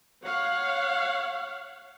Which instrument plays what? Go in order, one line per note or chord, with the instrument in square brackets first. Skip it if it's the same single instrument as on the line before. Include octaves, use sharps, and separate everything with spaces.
[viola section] C#5 F5 F#5